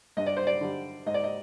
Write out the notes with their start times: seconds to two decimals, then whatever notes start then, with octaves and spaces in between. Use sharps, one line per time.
0.17 G2 D#5
0.26 D5
0.37 C5
0.47 D5
0.61 D3 G3
1.06 G#2 D#5
1.14 D5
1.24 D#5